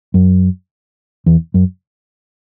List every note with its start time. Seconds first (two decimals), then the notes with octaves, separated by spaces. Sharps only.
0.14 F#2
1.26 E2
1.54 F#2